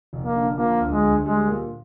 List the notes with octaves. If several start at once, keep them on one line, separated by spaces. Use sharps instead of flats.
F1
A#3
D3
F3 A#3
D2
G#3
D2
G3 G#3
A#2